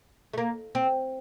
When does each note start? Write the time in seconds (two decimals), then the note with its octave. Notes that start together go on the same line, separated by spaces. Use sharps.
0.33 A3
0.38 A#3
0.75 C4